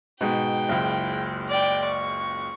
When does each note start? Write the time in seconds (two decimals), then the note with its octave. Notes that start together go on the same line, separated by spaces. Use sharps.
0.21 G#2 B2 G5
0.69 F#1 C#2
1.49 D5 G5
1.85 C#6